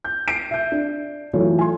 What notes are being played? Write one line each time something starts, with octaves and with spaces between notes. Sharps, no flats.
G6
C7 D7
E5 G6
D4
E3 F#3 A3 F4 C#5
G#5 C6